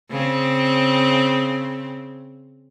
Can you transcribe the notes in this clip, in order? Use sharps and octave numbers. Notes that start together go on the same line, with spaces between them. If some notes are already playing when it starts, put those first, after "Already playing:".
C#3 C4